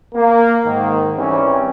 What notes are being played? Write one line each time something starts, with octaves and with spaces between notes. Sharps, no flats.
A#3
G#2 D#3
E3 G3 C4 C#4